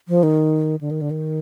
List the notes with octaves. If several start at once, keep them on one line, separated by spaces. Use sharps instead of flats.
F3
D#3
D3
D#3
D3
D#3